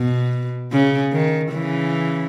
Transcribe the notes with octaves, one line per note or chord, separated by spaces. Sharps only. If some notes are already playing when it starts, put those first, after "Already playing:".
Already playing: B2
C#3
D#3
C#3 E3